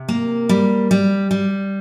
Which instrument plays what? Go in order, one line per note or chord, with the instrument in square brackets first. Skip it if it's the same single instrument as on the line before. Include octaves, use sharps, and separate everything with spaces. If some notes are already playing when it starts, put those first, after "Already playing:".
Already playing: [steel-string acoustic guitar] C3
A#3
G3
G3
G3